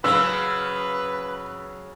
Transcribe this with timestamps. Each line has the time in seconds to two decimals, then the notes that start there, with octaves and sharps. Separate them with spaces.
0.04 C#3 F#3 B4 E6